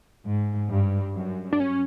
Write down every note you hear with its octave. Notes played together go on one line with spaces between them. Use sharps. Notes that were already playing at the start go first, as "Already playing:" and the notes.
G#2
G2
F#2
D4
C#4